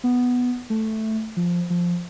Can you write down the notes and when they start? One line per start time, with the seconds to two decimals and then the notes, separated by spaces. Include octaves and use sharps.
0.04 B3
0.70 A3
1.37 F3
1.70 F3